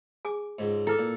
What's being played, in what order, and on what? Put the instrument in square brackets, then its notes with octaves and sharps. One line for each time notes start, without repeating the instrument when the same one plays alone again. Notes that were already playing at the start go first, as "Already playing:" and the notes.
[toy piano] G#4 G#5 D6
[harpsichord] C#2 G#2
[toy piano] E4 B4 D6 [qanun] A4
[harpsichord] A#2